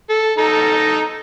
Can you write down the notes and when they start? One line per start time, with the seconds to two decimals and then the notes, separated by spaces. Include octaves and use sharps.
0.10 A4
0.38 D#4 A4 A#5